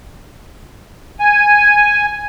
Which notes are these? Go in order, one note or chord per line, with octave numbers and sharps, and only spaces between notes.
G#5